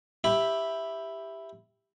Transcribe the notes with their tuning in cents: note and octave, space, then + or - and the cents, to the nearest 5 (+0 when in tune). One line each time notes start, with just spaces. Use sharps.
E4 +0 G4 +10